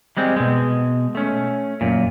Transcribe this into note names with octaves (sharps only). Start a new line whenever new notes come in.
G3 G#3 C4
B2 G#3
A3 C#4
F#2 A#2